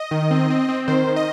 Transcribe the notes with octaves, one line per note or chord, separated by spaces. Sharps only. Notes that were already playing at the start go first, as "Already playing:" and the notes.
Already playing: D#5
D#3
C4
C4
C4
D#3 C5
D#3
D#5